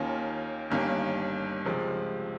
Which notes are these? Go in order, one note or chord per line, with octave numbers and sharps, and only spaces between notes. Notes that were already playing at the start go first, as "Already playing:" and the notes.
Already playing: D#2 D#3 A#3 C#4 F4
G1 G2 D#3 A#3 C#4
C#2 C3 F3 G#3